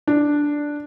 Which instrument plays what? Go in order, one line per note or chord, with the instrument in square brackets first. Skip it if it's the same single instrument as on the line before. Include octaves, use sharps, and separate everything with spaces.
[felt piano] D4